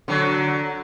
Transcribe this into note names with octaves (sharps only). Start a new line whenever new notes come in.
D3 F#3